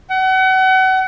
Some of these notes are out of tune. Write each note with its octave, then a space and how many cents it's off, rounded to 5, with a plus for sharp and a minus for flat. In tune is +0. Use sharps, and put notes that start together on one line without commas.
F#5 +35